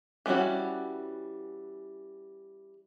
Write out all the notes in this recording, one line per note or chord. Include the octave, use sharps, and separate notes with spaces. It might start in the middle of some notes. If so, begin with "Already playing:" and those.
E3 G3 B3 C#4 F#4